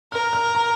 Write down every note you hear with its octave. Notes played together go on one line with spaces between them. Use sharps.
A#4 F6
F6
A#5